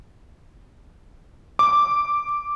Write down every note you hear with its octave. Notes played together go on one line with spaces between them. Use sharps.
D6